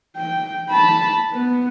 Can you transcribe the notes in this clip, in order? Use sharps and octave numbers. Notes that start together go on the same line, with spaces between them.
G5
A5 B5
B3